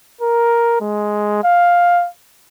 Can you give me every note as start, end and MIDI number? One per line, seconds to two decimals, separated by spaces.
0.21 0.77 70
0.80 1.42 56
1.44 2.07 77